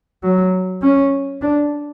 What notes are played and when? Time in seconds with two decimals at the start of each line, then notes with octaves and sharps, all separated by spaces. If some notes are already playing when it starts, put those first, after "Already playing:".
0.23 F#3
0.82 C#4
1.42 D4